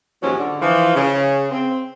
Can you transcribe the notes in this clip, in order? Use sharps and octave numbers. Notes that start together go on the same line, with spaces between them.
D#2 G#2 F3 F#3 C#4
D3
E3 F3
C#3
C4